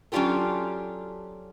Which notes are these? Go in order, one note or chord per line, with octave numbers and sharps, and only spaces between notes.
F#3 C#4 D4 F4 G4 A4